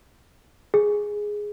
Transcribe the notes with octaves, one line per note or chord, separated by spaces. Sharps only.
G#4